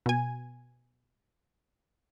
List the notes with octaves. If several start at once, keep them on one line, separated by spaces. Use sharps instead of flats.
B2 G#5